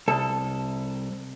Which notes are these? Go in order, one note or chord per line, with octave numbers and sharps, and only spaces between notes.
C2 A4